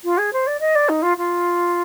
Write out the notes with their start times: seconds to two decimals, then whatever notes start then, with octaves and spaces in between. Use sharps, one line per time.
0.04 F4
0.18 G#4
0.33 C5
0.47 D5
0.60 D#5
0.75 D5
0.89 D#4
1.02 F4
1.18 F4